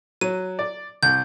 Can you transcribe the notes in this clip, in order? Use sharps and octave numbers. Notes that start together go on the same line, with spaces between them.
F#3 D#7
D5
C2 G6